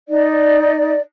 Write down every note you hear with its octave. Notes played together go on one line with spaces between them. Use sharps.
D#4 D5